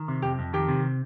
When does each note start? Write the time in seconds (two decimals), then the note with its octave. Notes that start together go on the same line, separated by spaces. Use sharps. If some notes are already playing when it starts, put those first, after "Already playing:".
Already playing: D#3
0.08 C3
0.22 F2 G4
0.39 F2
0.53 D#3 G4
0.68 C3